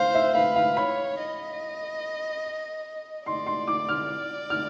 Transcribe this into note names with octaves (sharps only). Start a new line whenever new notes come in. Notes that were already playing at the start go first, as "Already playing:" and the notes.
Already playing: C5 F5
E5
B4 F5
F5
C#5 B5
D#5
D5 C6
C6
D6
F6
F6